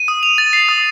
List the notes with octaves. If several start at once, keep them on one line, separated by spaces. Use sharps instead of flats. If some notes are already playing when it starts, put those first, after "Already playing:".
Already playing: D#7
D#6
F7
A6
C7
D#6